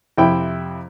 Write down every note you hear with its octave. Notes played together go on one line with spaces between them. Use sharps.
F2 C3 E4 G5 B5